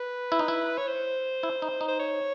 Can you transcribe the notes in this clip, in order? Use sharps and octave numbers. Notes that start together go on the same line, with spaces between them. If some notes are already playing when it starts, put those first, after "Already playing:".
Already playing: B4
E4
D#4
E4
C#5
C5
E4
D#4
D#4
C5
C#5